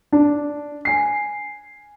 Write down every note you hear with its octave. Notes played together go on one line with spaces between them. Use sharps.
D4
G#5 C7